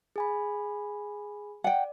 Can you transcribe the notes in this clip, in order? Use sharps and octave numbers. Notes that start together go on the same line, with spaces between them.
G#4 G#5 B5
D5 F#5 G5